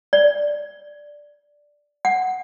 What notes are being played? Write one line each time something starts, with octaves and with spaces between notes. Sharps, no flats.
D5
F#5